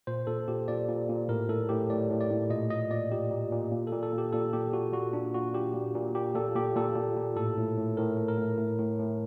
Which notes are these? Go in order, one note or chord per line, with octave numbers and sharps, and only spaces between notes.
A#2 C5
A#2 A4
A#2 G4
A#2 D5
A#2
A#2
A2 A#4
A2 A4
A2 G4
A2 D5
A2
D5
A2
A#2 D#5
A#2 D#5
A#2 D5
A#2 G4
A#2
A#2
A#2
A#2 A4
A4
A#2 G4
A#2 A4
A#2 G4
A#2 F#4
A#2 F#4
A#2 D4
A#2 F#4
A#2 G4
A#2
A#2
A#2 G4
A#2 A4
A#2 G4
A#2 A4
A#2
A#2
A2 A4
A2
A2
A2 A#4
A2
A#4
A2
A2
A2
A2